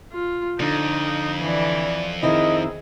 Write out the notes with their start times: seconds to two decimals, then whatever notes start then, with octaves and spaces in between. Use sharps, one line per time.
0.13 F4
0.60 F2 D3 D#4
1.42 E3 D5
2.23 D#3 C4 E4 G#4 D#5